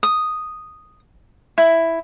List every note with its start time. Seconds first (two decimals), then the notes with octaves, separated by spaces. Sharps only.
0.03 D#6
1.58 E4